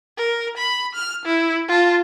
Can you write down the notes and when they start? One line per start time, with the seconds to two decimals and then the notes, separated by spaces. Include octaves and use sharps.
0.18 A#4
0.58 B5
0.95 F6
1.26 E4
1.68 F4 A5